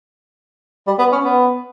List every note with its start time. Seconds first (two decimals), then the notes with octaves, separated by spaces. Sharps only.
0.87 G3
0.99 B3
1.12 C#4
1.25 B3